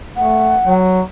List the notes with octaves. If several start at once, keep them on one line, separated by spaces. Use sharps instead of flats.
A3 F#5
F#3